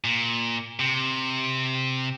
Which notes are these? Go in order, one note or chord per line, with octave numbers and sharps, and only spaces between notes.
A#2
C3